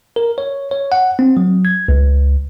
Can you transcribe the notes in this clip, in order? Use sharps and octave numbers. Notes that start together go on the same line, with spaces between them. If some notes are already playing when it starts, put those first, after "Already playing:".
A#4
C#5
C#5
F#5
C4
F#3
G#6
C#2